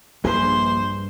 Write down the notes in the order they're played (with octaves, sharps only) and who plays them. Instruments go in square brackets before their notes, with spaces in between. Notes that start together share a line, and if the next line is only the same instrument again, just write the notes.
[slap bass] A#1 [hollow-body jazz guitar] G2 G#4 B4 [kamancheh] C5